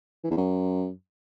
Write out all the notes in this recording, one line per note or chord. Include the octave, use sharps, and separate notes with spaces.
E3
E2
F#2